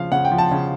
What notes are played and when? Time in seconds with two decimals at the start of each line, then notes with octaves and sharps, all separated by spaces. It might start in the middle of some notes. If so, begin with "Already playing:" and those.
Already playing: C#3 F3 F5
0.12 C#3 F#5
0.25 G5
0.32 F3
0.38 A5
0.51 C#3